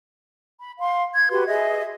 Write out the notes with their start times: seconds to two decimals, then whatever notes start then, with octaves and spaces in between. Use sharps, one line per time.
0.58 B5
0.79 F5 C6
1.14 G#6
1.30 F#4 G4 B4 C6
1.47 G#4 D#5 E5